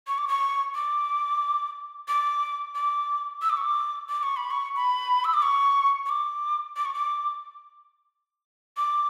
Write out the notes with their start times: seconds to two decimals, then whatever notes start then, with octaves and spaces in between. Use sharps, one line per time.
0.07 C#6
0.18 D6
0.28 C#6
0.75 D6
2.08 D6
2.75 D6
3.42 E6
3.50 D6
3.57 C#6
3.64 D6
4.09 D6
4.23 C#6
4.37 B5
4.51 C#6
4.76 B5
5.25 E6
5.34 D6
5.42 C#6
6.06 C#6
6.09 D6
6.77 D6
6.85 C#6
6.94 D6
8.77 D6